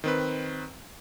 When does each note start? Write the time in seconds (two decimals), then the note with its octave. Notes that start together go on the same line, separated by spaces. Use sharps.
0.04 D#3 C4 B4